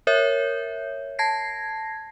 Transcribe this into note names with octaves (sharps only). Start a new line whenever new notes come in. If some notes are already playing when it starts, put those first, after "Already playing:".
A#4 C#5 E5 G6
A5 G#6 A#6 C7